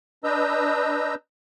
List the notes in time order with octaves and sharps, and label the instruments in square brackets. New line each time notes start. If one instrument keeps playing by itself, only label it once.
[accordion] D4 B4 D#5 A#5 E6 G6